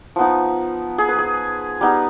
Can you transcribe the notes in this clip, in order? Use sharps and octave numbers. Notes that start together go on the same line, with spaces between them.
F3 B3 D#4
G#4
B4
G#4
G3 B3 D#4